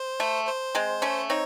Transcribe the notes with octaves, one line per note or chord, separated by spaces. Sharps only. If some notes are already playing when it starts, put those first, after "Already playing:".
Already playing: C5
A3
C5
G#3 C4
A3 C#4
C4 D#4 C#5